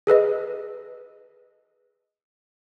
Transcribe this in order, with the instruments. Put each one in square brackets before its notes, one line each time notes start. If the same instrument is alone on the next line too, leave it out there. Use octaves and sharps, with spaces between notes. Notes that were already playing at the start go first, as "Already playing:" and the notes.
[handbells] G#4 A4 B4 D#5